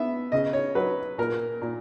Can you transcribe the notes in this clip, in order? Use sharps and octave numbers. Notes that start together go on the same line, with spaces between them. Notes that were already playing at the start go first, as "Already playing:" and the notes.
Already playing: B3 E5
C#3 D#5
C#5
F#3 B4
A#2 A#4
A#2